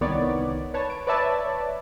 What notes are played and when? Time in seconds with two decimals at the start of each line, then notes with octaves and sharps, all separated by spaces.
0.01 C2 D#3 B3 C#5 D5
0.74 B4 C#5 A5
0.90 D7
1.07 B4 C#5 D5 E5 A5